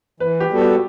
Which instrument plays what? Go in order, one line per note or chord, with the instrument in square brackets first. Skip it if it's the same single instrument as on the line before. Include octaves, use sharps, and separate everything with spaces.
[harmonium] E3 [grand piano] B4
[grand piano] G4
[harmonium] G3 B3 F#4 A4
[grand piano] G4